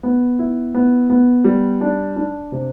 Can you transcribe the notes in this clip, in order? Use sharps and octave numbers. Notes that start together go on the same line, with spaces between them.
B3
E4
B3
B3
G3
D4
D4
C3